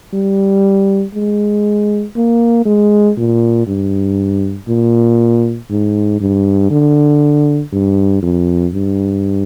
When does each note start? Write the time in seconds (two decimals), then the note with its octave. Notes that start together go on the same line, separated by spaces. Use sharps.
0.13 G3
1.14 G#3
2.16 A#3
2.65 G#3
3.17 A#2
3.67 G2
4.68 A#2
5.70 G#2
6.20 G2
6.70 D3
7.72 G2
8.22 F2
8.73 G2